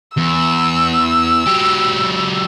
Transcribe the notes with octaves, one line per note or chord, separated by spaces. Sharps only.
E2 E6
F#3 G4